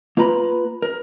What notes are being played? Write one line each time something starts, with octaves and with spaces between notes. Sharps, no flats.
A#3 F4 B4 A#5 B5
A#4